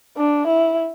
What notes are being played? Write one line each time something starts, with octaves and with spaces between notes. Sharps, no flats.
D4
E4